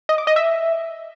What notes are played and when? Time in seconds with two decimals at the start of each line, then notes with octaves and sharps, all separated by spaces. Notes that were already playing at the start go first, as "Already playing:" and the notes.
0.09 D#5
0.18 D6
0.27 D#5
0.36 E5